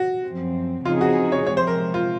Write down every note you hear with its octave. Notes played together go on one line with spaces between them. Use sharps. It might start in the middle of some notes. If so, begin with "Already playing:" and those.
Already playing: F#4
F#2 F3 C4
C#3 F3 C4 D#4 F4 G#4
F#4
C#5
C3 F3 G#3 C4 C#5
C5
A#4
F4